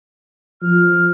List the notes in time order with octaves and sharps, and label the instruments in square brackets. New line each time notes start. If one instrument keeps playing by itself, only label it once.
[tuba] F3 [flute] F6